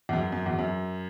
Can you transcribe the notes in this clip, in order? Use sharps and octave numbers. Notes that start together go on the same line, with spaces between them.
E2
F#2
F#2
E2
F#2